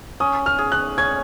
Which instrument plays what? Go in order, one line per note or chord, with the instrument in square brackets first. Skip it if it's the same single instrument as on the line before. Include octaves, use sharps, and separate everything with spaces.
[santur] C#4 [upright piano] D#6
[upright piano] F6
[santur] G#4
[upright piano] F#6
[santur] C#4 [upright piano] G#6